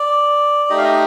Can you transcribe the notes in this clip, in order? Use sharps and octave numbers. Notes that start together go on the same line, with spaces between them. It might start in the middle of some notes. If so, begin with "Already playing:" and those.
Already playing: D5
A3 D#4 G4 D#5
F5
D#5